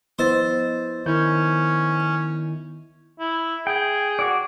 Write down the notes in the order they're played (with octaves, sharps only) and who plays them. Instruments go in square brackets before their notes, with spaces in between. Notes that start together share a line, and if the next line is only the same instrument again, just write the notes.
[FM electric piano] F3 B3 D#5 [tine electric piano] E4 E6 A6 [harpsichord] C5
[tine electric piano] D#3 E4 G6 [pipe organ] C#4
[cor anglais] E4
[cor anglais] G#4 [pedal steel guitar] G5
[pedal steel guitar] F#4 D5